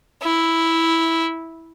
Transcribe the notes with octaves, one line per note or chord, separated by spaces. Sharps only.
E4